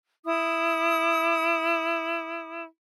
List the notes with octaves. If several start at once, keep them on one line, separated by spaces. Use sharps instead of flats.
E4 D#6